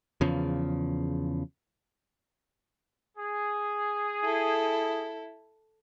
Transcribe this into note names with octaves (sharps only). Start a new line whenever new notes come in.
E2 C#3 F3
G#4
E4 A4